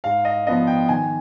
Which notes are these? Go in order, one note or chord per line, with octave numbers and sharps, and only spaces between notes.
G#2 F5
D#5
F3 B3 D4 D#5
G5
D#3 G#5